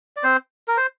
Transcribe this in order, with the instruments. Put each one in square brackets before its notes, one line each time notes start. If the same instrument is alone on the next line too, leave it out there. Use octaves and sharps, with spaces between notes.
[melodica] D5
C4 C5
A#4
C5